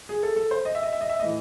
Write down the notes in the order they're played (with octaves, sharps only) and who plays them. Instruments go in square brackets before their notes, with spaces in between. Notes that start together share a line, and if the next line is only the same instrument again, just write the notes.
[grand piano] G#4
A4
A4
C5
D#5
E5
D#5
E5
D#5
E5
A2 E3 D#5